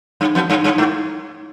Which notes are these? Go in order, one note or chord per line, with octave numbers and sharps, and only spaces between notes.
G2
F2
G2
G2
G#2